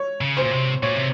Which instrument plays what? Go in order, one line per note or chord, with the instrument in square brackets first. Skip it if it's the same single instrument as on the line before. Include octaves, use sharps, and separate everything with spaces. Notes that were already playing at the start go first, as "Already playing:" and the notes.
Already playing: [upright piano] C#5
[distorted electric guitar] C#3
[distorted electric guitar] A#2 [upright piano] C5
[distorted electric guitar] C3
[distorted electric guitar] A#2 [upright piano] C#5
[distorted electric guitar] C3